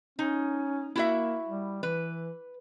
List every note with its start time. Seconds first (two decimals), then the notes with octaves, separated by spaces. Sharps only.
0.19 C#4 D#4
0.96 A#3 E4 F#4 E5
1.48 G3
1.83 E3 B4